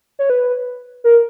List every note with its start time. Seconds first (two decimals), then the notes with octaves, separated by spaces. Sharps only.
0.19 C#5
0.30 B4
1.04 A#4